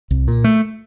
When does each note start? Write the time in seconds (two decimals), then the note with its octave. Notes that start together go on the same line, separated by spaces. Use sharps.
0.11 C2
0.28 A#2
0.44 A3